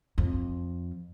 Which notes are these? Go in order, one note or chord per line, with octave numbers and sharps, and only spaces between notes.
F2